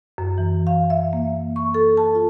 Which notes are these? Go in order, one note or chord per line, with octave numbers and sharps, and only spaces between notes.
F#2
E3
F5
E5
A#3
C#6
A4
A5
F4